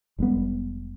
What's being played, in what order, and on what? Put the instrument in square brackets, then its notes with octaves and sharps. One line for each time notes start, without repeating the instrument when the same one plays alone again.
[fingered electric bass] F1 G3 G#3 B3